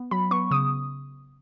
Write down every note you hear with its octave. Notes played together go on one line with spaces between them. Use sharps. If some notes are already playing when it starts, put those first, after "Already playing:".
Already playing: B3
F#3 B5
B3 C#6
C#3 D#6